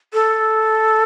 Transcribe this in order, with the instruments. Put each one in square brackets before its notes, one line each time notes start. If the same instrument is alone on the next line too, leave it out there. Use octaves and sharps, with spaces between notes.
[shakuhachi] A4